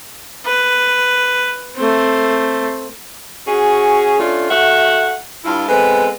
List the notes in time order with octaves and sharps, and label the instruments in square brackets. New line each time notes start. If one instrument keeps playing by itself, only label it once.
[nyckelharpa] B4
A3 C4
[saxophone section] C#4 F#4 G#4
A3 C#4 D4 F4
A3 F#4 E5 F#5
G2 E4 F4
G#3 A3 B3 C4 B4